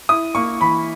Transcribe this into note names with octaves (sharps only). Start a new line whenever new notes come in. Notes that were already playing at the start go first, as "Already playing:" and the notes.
E4 D#6
A#3 C#6
E3 B5